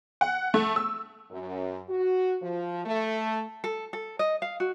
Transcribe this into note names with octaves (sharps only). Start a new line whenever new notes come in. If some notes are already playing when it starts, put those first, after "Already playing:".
F#5
A3
E6
F#2
F#4
F3
A3
A4
A4
D#5
F5
F#4